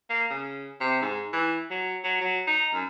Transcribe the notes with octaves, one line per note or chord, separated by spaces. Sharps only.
A#3
C#3
C3
G#2
E3
F#3
F#3
F#3
D#4
F#2